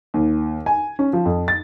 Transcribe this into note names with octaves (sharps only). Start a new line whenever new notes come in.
D#2
G#5
C#4
F3
F2
A6